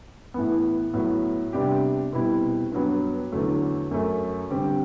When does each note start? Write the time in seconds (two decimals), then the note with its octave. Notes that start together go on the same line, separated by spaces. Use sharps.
0.34 A2 E3 B3
0.94 A2 F#3 B3
1.53 C3 G3 B3 D4 G4
2.13 B2 G3 C4 E4
2.72 G2 F#3 B3
3.32 E2 D3 F#3 A3
3.91 F#2 F#3 A3
4.50 D3 G3 C4 G4